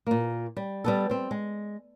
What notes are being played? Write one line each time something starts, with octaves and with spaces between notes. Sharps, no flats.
A#2 A#3
G3
G3 B3 A4
G3 C4
G#3